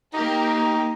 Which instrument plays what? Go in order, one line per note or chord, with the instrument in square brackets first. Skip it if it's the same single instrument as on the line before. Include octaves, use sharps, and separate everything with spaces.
[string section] A#3 G4 A#4 [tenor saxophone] D#4